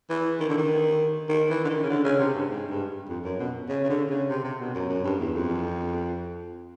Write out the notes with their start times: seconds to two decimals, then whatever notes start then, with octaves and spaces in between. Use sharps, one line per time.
0.10 E3
0.40 D#3
0.49 D3
0.58 D#3
1.29 D#3
1.50 E3
1.65 D3
1.69 D#3
1.83 C#3
1.90 D3
2.04 C#3
2.19 C3
2.34 G2
2.50 G#2
2.70 G2
3.09 F2
3.25 F#2
3.40 B2
3.69 C#3
3.84 C#3
3.90 D3
4.10 C#3
4.29 C3
4.44 C3
4.60 B2
4.75 F#2
4.89 F#2
5.05 G2
5.20 E2
5.34 F2